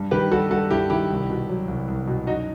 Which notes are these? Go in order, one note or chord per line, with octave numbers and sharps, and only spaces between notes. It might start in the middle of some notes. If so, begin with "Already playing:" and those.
Already playing: G2
D#3 G4 B4
G3 F#4 A4
G2 F#4 A4
G2 E4 G4
D#3 E4 G4
C2
B2
F#3
C2
C2
B2
F#2 D#4 F#4